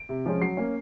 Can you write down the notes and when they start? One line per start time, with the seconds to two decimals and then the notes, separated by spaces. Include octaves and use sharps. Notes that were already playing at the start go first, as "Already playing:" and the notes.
Already playing: D7
0.09 C3
0.26 F3 G#3 C#4
0.41 F#3 C7
0.57 A#3 C#4